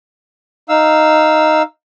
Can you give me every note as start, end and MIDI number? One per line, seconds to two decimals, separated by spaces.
0.69 1.62 63
0.69 1.62 77
0.69 1.62 88